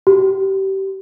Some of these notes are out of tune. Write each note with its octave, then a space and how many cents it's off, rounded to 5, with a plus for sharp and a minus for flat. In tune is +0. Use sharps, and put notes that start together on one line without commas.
G4 -25